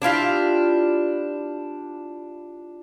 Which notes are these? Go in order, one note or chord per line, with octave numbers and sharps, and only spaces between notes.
D4 E4 F4 G4